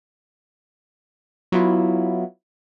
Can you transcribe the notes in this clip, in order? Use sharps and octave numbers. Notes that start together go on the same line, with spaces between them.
F#3 B3 E4 F4